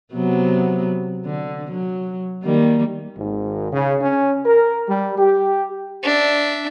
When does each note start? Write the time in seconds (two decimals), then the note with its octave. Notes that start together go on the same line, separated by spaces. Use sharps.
0.14 C3 F#3 B3
1.25 D3
1.71 F#3
2.43 D#3 G3 A#3
3.17 G#1
3.72 C#3
4.02 C#4
4.44 A#4
4.87 G3
5.18 G4
6.03 D4 E5